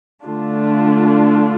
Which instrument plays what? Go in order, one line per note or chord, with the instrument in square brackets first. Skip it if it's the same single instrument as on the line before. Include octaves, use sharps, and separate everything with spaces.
[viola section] D3 A3 D4 F4